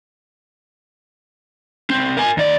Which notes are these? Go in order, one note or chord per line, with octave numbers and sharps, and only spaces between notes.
C2 C4
A#4 G#5
D#2 D5